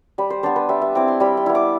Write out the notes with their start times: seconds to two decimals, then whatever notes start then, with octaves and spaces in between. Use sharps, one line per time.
0.18 G3 B5
0.30 C5
0.43 B3 D4 C5
0.56 B4
0.69 G3 E5
0.82 E5
0.95 C4 E4 D6
1.08 C6
1.20 G3 B5
1.37 C6
1.46 B3 E4
1.55 D6